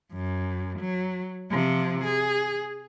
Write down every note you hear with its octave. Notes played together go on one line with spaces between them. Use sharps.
F#2
F#3
C3 F3
G#4